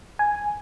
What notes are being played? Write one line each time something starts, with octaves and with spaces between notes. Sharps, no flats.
G#5